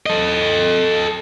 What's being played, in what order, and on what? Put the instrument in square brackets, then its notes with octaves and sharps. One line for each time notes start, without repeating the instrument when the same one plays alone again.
[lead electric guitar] A4 D#5